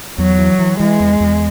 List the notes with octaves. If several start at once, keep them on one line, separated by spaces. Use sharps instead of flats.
E2 F#3
E3
E3
E3 G#3
E2
E2